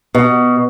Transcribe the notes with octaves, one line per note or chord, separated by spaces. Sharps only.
B2